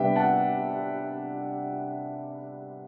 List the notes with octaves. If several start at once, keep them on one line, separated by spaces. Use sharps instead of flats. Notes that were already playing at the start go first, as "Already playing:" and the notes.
Already playing: C3 G3 B3 D4 E5 G5
F#5 A5